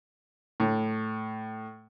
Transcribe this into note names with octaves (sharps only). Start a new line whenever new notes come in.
A2